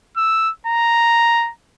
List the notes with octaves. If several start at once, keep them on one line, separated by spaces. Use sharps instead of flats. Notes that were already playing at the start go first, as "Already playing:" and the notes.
E6
A#5